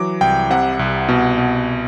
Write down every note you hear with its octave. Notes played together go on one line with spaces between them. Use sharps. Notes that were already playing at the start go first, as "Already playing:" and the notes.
Already playing: E3 F#3 D6
C2 G5
C3 F#5
C2
B2
B2